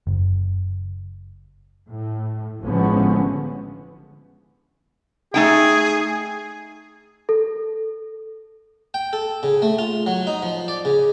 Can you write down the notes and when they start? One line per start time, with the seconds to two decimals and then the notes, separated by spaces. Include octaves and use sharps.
0.07 F#1
1.88 A2
2.62 A1 D3 F3 G#3 B3 C#4
5.34 A3 D#4 G#4 G5
7.29 A4
8.94 G5
9.13 A4
9.43 C#3
9.62 A3
9.79 F4
10.07 F#3
10.27 D#4
10.42 F3
10.68 D5
10.85 C#3